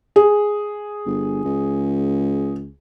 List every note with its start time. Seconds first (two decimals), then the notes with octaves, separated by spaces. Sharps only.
0.16 G#4
1.06 G1
1.45 C#2